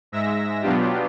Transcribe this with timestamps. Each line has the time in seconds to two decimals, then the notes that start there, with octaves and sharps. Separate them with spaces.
0.12 G#2 G#3 E5 E6 A#6
0.62 B2 F#3 B3 D4 F4 G4